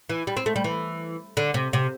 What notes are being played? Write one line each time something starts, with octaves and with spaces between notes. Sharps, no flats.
E3
G3
C4
A3
G3
E3
D3
C3
C3